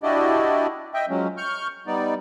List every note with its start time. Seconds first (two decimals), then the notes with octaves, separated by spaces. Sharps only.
0.03 D4 E4 F#4 G4 D5 D#5
0.94 D#5 E5 G5
1.10 F3 F#3 G#3 C#4
1.37 C#6 F6 G6
1.87 G3 B3 D#4 D5